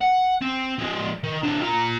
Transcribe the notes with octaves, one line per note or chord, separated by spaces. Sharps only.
F#5
C4
F3 G#3
D#3
C3 D4
F4 A#5